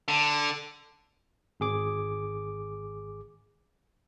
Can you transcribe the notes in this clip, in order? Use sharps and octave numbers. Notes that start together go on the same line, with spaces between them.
D3
G#1 G#4 D6